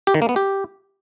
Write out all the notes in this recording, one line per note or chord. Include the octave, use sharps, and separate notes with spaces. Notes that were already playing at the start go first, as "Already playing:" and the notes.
G4
D#3
A#3
B3
G4